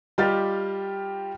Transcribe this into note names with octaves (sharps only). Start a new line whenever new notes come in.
G3 F4 G4 D#5 F6 A6